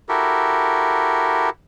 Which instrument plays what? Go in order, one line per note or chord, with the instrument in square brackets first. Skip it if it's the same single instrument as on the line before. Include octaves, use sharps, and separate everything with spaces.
[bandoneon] E4 F#4 G4 A4 A#4